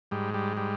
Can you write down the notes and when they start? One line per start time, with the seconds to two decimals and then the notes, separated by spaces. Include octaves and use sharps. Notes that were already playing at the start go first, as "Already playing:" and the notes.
0.11 G#2 G3
0.34 G3
0.57 G3